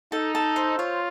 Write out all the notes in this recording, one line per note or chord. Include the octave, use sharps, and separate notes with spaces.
D#4 A4
A4
C5
F4 C#5